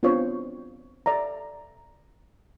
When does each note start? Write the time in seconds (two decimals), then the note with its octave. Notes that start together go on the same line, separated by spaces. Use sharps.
0.03 B3 C4 D4 F4 C5 C#5
1.06 A4 D5 E5 A#5